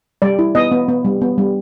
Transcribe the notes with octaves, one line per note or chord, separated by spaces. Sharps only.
G3 D5
E4
B3 D#5
B3
B3
G3
B3
G3